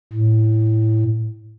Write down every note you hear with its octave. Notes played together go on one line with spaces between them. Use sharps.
A2